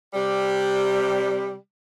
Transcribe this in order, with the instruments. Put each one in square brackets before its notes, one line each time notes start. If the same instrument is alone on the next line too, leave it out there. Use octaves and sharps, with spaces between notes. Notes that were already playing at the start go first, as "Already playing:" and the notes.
[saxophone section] C3 G3